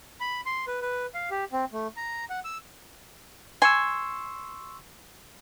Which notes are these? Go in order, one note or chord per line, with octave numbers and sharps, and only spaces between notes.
B5
C6
B4
B4
F5
G4
C4
A3
A#5
F#5
E6
G#5 C6 C#6 E6